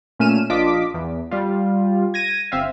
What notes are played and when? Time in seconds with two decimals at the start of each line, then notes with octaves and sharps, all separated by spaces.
0.19 A#2 A3 C#4 F6 D#7 E7
0.50 A#1 D4 F4 D#5 D6 B6
0.94 E2
1.31 G3 F4
2.14 G#6 A#6 D#7
2.52 G1 C4 E5 F5